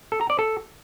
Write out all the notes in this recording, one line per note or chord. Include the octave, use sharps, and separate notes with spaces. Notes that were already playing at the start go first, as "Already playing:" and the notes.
A4
A#5
D5
A4